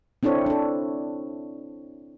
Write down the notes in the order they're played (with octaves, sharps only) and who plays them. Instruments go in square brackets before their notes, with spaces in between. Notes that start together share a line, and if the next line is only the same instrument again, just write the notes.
[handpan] C4 D4 E4 A4 C#5
D4 A4